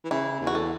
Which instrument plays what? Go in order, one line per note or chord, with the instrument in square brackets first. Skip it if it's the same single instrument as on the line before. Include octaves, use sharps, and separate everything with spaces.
[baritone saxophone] E3
[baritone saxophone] C#3 [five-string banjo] E4
[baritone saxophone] E2
[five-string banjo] F#4
A4